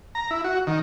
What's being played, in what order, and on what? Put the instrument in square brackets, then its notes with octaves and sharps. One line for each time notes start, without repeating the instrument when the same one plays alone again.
[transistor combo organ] A#5
E4
F#4
D#3